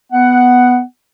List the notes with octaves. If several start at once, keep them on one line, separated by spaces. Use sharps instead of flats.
B3 F#5